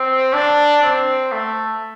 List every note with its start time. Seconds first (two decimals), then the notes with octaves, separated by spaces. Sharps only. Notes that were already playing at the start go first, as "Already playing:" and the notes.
Already playing: C4
0.34 D4
0.83 C4
1.32 A3